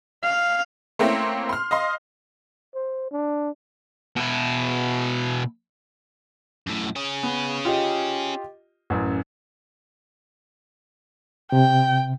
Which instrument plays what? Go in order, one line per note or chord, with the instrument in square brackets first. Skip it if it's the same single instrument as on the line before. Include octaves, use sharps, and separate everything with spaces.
[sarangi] F5
[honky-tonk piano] A3 A#3 C4 C#4 E4
C6 F6
D#5 F5 C6
[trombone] C5
D4
[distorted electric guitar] B2 E4
[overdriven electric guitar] F#2 A2
C#4 G#4
[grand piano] B3
F4 G4 D#5
A1 F#2
[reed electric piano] C3 [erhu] G5